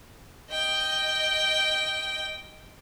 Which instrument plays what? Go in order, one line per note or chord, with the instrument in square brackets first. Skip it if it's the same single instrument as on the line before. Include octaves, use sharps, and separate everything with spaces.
[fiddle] D#5 G5